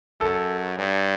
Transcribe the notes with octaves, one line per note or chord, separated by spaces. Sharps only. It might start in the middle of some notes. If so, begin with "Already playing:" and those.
F#2 A4
G2